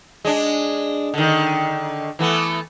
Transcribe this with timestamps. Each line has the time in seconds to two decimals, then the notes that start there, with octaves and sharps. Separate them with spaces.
0.25 G#3 D4
1.14 D3 D#3
2.19 E3 A3 B3